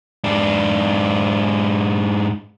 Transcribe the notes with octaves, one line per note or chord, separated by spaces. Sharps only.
G#2 D4